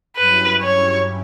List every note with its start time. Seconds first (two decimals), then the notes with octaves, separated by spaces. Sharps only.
0.17 G2 F#3 C#4 E4 G4 B4
0.62 C#5